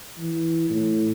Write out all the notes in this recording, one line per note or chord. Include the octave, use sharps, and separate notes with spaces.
E3
A2